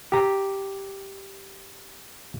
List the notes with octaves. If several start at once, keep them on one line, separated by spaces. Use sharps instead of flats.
G4 A#5